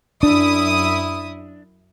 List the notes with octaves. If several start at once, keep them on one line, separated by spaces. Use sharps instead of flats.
F#2 D4 E4 D#6